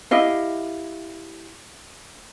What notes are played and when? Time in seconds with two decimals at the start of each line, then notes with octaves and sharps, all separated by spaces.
0.11 E4 G4 D#5 F5